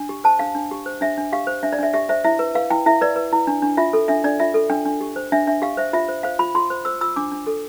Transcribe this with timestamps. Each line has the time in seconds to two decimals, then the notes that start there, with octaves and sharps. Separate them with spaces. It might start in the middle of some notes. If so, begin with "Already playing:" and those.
Already playing: D4
0.09 G4
0.24 C5 A5
0.39 D4 F5
0.55 D4
0.71 G4
0.86 C5
1.01 D4 E5
1.17 D4
1.33 G4 F5
1.47 C5
1.63 D4 E5
1.73 D5
1.79 D4 E5
1.94 G4 E5
2.09 C5 E5
2.24 E4 E5
2.39 B4
2.55 B4 F5
2.70 E4 G5
2.86 E4 E5
3.01 B4 D5
3.16 B4
3.33 E4
3.47 D4
3.62 D4
3.77 F4 E5
3.93 A4
4.08 D4 E5
4.24 D4 D5
4.40 F4 E5
4.54 A4
4.70 D4 G5
4.85 D4
5.01 G4
5.16 C5
5.32 D4 E5
5.47 D4 E5
5.62 G4 F5
5.77 C5 E5
5.93 F4 E5
6.08 C5
6.23 C5 F5
6.39 F4 B5
6.55 F4 C6
6.70 C5
6.85 C5 E6
7.01 F4 E6
7.16 D4 D6
7.32 D4
7.47 A4